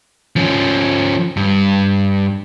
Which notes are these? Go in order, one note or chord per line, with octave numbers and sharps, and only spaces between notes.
F3 C#4
G2